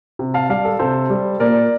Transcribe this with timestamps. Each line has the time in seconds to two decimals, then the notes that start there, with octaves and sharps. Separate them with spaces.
0.19 C3
0.34 F5 A5
0.49 G3 D5 F5
0.65 A4
0.79 C3 A4 C5
1.10 G3
1.40 A#2 A#4 D5